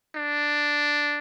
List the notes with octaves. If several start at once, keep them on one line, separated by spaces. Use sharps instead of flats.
D4